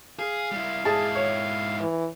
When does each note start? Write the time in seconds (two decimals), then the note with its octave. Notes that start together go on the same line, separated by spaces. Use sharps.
0.19 G#4 F5
0.52 G3 E4
0.85 G#2 E4 G#4 A5
1.15 C#5
1.80 E3